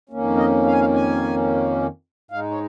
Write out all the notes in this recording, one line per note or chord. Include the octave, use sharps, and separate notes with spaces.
F2 D#3 A#3 C#4
D#5
F5
G#5
F5
G#5
G#2 G#3 D#4 F5
C#5